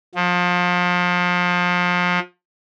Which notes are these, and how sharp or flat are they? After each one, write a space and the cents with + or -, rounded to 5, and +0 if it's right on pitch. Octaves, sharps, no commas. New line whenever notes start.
F3 +30